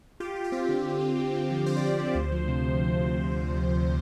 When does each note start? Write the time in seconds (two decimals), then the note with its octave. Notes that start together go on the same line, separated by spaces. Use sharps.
0.20 F4 G4
0.36 F4
0.44 G4
0.52 C4 F4
0.69 D3 F4
0.85 D3
1.01 F4
1.18 D3
1.34 C4
1.51 F3
1.66 F3 C5
1.76 D5
1.83 F4 C5
1.99 D3
2.15 D2
2.32 F3
2.48 C3